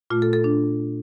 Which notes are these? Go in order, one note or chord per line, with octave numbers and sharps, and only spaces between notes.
A#2 A3 F4
A4
A4
D4